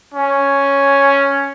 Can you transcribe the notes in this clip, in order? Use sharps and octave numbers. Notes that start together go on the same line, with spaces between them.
C#4